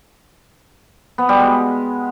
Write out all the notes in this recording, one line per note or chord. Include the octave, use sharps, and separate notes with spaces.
B3
G3
G#3